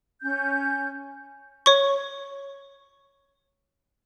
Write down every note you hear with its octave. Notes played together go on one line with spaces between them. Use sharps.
C#4 G6
C#5 C#6